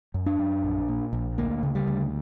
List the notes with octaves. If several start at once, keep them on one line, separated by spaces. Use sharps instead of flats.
F#2
D4
F#2
A#1
A#2
A#1
D2 A#3
C#3
G3
D2